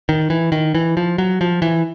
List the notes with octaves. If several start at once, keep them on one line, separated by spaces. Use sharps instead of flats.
D#3
E3
D#3
E3
F3
F#3
F3
E3